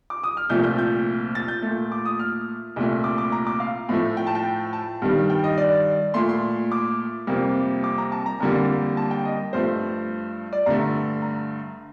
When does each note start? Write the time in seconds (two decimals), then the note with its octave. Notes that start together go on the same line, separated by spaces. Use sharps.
0.10 D6
0.24 D#6
0.37 F6
0.50 C2 A#2 F3 A3 G6
0.64 G6
0.78 G6
1.35 A6
1.48 G6
1.62 A#2 A3
1.92 D6
2.05 D#6
2.19 F6
2.76 C2 A#2 A3
3.04 D6
3.18 D6
3.32 A#5
3.47 D6
3.60 F5
3.89 A2 F3 A3
4.17 G5
4.27 A5
4.35 G5
4.73 A5
5.02 G2 D#3 G3
5.30 G5
5.44 D#5
5.58 D5
6.14 A#2 A3 C6
6.29 C6
6.72 D6
7.27 F2 C3 G3 A#3
7.84 D6
7.98 A#5
8.12 A5
8.26 A#5
8.40 F2 D3 G3 A#3
8.97 A5
9.11 G5
9.25 D#5
9.53 G2 F3 A3 C5
10.53 D5
10.66 G2 D3 A3 A#5
11.22 A#5